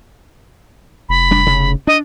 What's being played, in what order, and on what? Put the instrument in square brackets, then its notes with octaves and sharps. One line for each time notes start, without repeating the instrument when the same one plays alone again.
[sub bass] F1 [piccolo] B5
[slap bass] G3 D4
C#3
[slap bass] D4 [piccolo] D#5